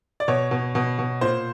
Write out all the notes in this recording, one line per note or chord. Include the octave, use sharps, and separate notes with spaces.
D5
B2 C#5
B2
B2
B2
A#2 C5